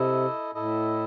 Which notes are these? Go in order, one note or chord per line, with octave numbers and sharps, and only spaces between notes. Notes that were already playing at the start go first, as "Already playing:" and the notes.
Already playing: C3 E4 A4 D#5
A2 E4 A4 D#5